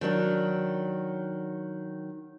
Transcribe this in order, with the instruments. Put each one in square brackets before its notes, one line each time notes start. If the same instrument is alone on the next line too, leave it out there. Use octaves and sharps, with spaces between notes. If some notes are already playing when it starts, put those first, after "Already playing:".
[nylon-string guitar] D#3 F#3 D4